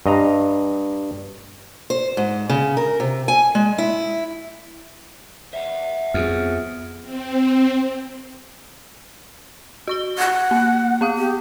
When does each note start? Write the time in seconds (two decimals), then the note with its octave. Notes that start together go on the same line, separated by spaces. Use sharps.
0.06 G2 D#5 A#5
1.90 C5
2.17 G#2
2.49 C#3
2.77 A#4
3.00 C3
3.28 G#5
3.55 G#3
3.78 E4
5.53 E5 F#5
6.14 F2 B3 G#4 F6
7.02 C4
9.87 F#4 C#6 G7
10.18 F#5 G#6
10.51 A#3
11.01 B3 F5 D#6
11.18 G4